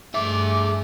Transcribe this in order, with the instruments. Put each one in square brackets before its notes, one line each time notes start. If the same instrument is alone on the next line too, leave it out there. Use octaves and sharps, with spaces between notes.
[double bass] G2 A3 [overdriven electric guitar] G#4 E5 [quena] D6